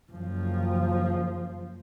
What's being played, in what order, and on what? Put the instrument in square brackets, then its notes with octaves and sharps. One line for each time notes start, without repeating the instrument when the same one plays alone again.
[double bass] F#1 F3